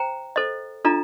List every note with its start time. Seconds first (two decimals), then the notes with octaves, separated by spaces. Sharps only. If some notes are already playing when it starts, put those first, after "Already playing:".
Already playing: C5 G5 A#5
0.36 A4 C5 D#5
0.85 D4 F4 A4 D#5 A#5